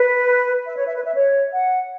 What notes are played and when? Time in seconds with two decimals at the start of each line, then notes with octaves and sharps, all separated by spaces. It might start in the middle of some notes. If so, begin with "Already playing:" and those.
Already playing: B4
0.66 E5
0.76 C#5
0.86 E5
0.95 B4
1.05 E5
1.14 C#5
1.53 F#5